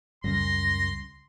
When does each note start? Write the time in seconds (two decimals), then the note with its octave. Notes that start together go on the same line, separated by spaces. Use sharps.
0.24 C#2 F#2 C#3 G3 C6 A#6